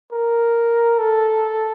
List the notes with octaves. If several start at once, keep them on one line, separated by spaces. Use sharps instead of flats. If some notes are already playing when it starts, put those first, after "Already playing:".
A#4
A4